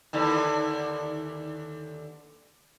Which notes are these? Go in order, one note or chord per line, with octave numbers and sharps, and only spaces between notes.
D#2 D3 E3